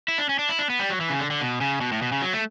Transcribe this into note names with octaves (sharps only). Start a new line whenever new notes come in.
E4
D4
C#4
D4
E4
D4
B3
G3
F#3
E3
C#3
D3
D3
B2
C#3
B2
A2
B2
C#3
F#3
A3